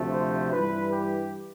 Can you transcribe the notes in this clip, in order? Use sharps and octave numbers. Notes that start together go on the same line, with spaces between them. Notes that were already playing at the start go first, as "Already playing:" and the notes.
Already playing: D2 C3 F3 A3
C5
G2 E3 G3 B4
G4